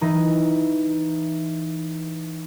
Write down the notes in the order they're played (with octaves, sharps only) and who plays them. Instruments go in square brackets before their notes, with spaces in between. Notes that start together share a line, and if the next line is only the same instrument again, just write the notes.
[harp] E3 D#4